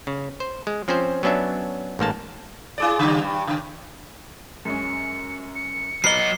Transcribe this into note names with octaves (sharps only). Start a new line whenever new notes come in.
C#3
C5
G#3
F3 C4 C#4 C5
F#3 B3 C#4 D4 E5
A1 G#2 A#3 A5
E4 G#4 D5
C#3 G3
G2
C#3
F#2 G#3 C#4 C#7
C#7
F#3 B4 D#5 A#5 B5 F6 C7 G7